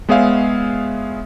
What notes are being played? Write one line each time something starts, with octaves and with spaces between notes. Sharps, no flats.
G#3 B3 G#4 C#5 E5 F5